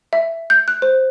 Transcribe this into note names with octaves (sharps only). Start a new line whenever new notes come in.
E5
G6
F#6
C5